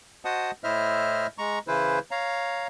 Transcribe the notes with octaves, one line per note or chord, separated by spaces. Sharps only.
F#4 C5 D#5 F#5 A5 D#6
A2 E4 C5 D#5 E5 F6
G#3 A#5 C#6
C#3 E3 E4 B4 C5
C#5 F5 A#5